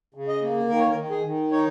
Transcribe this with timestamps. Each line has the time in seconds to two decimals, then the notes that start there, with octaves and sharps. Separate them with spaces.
0.14 C#3
0.28 D#5
0.42 A#3
0.69 D#3 A#4
0.79 C#5
0.90 A#4
0.96 D#3
1.10 G#4
1.24 D#3
1.51 D#4 C#5